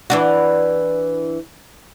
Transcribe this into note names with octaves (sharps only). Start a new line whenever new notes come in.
E3 D4 F#4